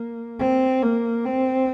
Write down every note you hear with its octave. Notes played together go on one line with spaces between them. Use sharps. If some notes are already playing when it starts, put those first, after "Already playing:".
Already playing: A#3
C4
A#3
C4